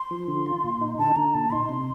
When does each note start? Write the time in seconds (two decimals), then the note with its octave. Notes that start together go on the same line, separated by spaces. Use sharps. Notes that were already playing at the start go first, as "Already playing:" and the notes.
Already playing: C6
0.11 F3
0.28 D3
0.46 F4
0.64 A#2
0.81 D#4
0.99 D3 A5
1.16 D3 A#5
1.34 A#2 A5
1.52 D#4 C6
1.69 C3